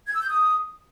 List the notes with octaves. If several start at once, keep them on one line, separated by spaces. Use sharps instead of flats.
G#6
E6
G6
D#6